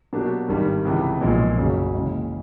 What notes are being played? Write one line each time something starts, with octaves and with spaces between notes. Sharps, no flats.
B2 F#3 A#3 D4 G4
G#1 G2 D#3 G3
C#2 C3 E3
B1 A#2 F3 G#3
F#1 F#2 C#3 F#3
D#2 C#3 E3 G#3